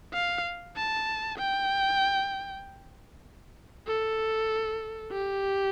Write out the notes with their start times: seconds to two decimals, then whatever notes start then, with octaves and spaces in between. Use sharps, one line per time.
0.13 F5
0.76 A5
1.38 G5
3.88 A4
5.12 G4